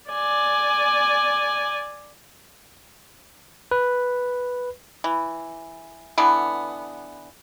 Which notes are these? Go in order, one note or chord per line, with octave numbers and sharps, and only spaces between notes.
D5 G#5
B4
E3
D3 E3 B3